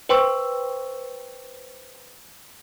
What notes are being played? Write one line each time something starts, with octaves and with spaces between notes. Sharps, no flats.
B4 C5 G5 C6 C#6 E6